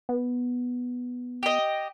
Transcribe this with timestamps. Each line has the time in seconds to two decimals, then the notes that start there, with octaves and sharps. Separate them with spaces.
0.09 B3
1.43 G4 D#5